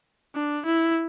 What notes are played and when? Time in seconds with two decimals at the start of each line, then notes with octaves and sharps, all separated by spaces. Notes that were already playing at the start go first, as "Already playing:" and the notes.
0.36 D4
0.66 E4